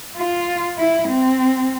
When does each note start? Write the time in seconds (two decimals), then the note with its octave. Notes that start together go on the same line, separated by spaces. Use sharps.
0.17 F4
0.78 E4
1.08 C4